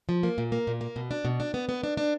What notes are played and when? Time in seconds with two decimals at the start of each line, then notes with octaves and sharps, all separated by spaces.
0.09 F3
0.23 A#3
0.38 A#2
0.52 A#3
0.67 A#2
0.81 A#3
0.96 B2
1.11 D4
1.25 B2
1.40 D4
1.54 B3
1.69 B3
1.84 D4
1.97 D4